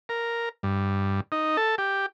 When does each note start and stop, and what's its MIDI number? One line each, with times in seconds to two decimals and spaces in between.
0.09 0.49 70
0.63 1.20 43
1.32 1.57 63
1.57 1.75 69
1.78 2.06 67